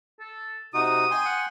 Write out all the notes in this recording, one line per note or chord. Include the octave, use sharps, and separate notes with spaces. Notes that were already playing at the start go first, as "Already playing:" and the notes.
A4
C3 D#4 F#4 D#6
G5 G#5 C6
F#5